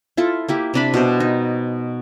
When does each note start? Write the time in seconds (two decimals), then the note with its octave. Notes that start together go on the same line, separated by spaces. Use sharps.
0.17 E4 F4 A4
0.48 A#3 E4 G4
0.74 C3 D4 B5
0.94 B2 G3 C5
1.20 D#4